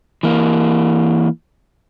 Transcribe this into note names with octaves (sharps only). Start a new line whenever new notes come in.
E3 A#3